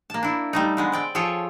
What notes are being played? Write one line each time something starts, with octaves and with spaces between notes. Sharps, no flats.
A#3 A5
D4 E4
G3 A3 D#4
D3 G#3 B3
C4 D5 G5
F3 F4 G#4 A4 C#5 G5